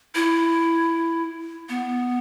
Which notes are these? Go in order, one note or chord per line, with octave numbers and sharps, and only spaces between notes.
E4
B3